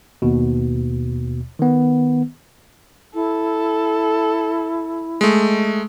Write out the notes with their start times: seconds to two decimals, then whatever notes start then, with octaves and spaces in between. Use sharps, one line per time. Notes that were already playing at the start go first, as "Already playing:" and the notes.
0.22 D#2 B2
1.59 D#3 B3
3.15 E4 A4
5.21 G#3 A3